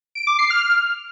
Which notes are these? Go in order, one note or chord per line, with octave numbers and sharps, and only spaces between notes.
D7
D6
C7
F6